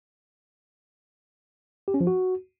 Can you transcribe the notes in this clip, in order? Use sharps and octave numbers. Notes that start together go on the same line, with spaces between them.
G4
C#4
F3
F#4